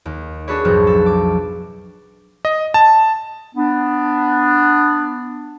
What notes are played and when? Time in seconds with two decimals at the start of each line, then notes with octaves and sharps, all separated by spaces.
0.05 D#2
0.48 D4 F#4 G#4 A4 B4 C#5
0.65 B1 F2 G#2 F3 F#3
0.87 A4
1.06 D6
2.45 D#5
2.74 A5
3.56 B3 D4